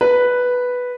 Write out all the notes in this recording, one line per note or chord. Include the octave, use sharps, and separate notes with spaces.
B4